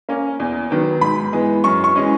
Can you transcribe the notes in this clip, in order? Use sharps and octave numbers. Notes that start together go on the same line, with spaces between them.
A#3 C#4
E2
D#3 F#3 B3
G#2 B5
E3 G#3 B3
F#2 C#6
C#6
E3 G#3 C#4